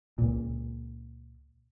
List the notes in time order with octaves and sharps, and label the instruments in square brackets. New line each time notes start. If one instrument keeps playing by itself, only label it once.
[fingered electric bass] C#2 A#2